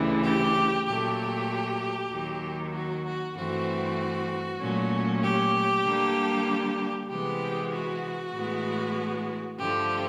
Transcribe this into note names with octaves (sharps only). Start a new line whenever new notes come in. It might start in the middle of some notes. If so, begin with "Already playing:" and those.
Already playing: D2 C#3 E3 G3
G4
A#2 F#3 A3 G4
D#2 D#3 F#3
F#4
F#4
G2 E3 A3 C4 F#4
A#2 F#3 A3 C#4
G4
D3 G3 A#3 D4
C3 E3 G#3 B3 G4
F#4
A2 E3 G#3 B3
G2 D3 F3 A3 G4